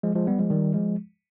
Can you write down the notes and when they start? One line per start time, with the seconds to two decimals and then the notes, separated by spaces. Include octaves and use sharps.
0.03 F3 G#3
0.15 F3 G#3
0.27 G3 B3
0.39 F3 G#3
0.50 D#3 G3
0.74 F3 G#3